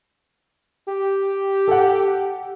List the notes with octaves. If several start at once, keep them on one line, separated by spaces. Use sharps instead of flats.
G4
A4 F#5